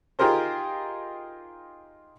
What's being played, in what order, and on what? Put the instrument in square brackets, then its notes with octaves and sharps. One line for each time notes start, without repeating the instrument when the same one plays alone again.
[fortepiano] D#4 F4 G4 G#4 A#4 C5